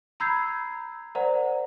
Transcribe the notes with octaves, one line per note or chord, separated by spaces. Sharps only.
A#5 B5 E6 G6 G#6 C7
A#4 C5 D5 F#5 A#5